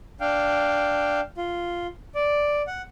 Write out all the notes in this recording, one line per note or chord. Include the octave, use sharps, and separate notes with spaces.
D4 F5 G5
F4
D5
F#5